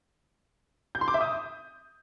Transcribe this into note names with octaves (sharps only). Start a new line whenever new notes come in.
G6
C6
D6
E5
D#6